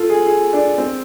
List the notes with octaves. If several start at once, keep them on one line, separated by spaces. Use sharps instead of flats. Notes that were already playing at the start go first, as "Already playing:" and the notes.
Already playing: F4 A4
G#4
G#4
D4
C4